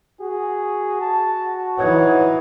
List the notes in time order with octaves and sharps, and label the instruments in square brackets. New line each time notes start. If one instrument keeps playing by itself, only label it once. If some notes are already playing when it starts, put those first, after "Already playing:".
[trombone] F#4 [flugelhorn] G#4
[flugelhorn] A5
[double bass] E3 D#4 [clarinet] C#5 [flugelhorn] F#5